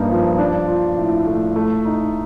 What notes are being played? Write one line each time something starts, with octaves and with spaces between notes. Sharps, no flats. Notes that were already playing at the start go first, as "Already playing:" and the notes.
Already playing: G2 A#3 D#4
F3
D4
F4
A2
A3
A3
D#4